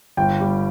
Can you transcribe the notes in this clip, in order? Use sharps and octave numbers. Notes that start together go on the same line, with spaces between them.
G1 G5
G3